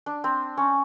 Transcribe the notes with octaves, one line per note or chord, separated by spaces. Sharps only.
D4
C4
C#4